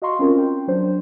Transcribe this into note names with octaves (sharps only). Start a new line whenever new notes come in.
F#4 D#5 F5 A#5 C6 C#6
C4 C#4 F4 A#4
G5
F#3 D4 C5